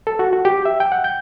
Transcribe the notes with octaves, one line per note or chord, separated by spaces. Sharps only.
A4
F#4
F#4
G4
E5
G5
F#5
G6